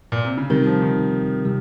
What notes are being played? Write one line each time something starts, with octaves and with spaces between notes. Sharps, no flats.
A#2
C3
C#3
C3 D#3 G3 C4 G4 A#4
F3
D#3
C3 G3 G4